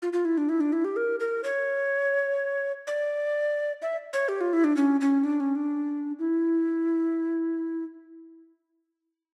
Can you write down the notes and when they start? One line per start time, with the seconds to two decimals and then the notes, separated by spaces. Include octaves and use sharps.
0.02 F4
0.13 F4
0.25 E4
0.38 D4
0.49 E4
0.60 D4
0.73 E4
0.85 G4
0.96 A#4
1.20 A#4
1.44 C#5
2.87 D5
3.82 E5
4.13 C#5
4.29 G4
4.41 F4
4.53 E4
4.64 D4
4.76 C#4
5.01 C#4
5.24 D4
5.40 C#4
5.55 D4
6.19 E4